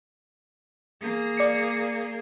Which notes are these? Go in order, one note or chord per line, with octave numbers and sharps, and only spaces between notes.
A#3 G#4
D5 C#7